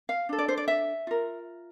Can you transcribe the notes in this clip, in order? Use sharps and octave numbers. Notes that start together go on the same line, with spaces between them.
F5
D4 A4
D5
C5
D5
E5
F4 A#4